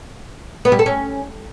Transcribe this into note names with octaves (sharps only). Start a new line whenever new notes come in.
B3
G3
A4
C#4